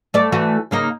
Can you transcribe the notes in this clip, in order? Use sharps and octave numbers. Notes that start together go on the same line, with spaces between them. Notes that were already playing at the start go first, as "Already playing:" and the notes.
A3 D5
E3 A3 F#4
C#3 A#3 D#4